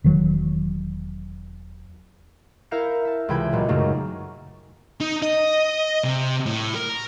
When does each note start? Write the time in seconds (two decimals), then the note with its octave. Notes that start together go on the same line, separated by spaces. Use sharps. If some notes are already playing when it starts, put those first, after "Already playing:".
0.04 E1 D#3 F#3
2.71 E4 A#4 E5 F5 G6 C#7
3.05 E5 A5
3.28 C#2 C3 E3 G5 B5 G#6
3.52 B1 A#2
3.68 F#2 C#3 G#3 A3 D#4
5.01 D#4
5.23 D#5
6.04 C3
6.46 A2
6.76 A#4